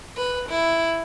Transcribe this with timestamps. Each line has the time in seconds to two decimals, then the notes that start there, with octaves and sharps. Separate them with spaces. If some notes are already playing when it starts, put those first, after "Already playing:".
0.16 B4
0.49 E4